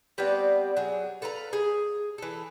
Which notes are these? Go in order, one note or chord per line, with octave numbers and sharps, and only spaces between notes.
G3 B3 C4 D5
F#3 G#4
A4 B4 F5 A#5
G#4
E3 A4